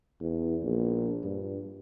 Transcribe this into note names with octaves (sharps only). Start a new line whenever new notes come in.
E2
A#1
G2